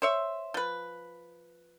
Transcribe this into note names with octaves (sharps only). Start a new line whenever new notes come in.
C5 C#5 E5
F3 B4